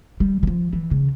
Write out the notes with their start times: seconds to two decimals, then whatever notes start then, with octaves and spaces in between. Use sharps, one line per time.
0.20 G3
0.43 E3
0.47 F3
0.73 E3
0.91 C#3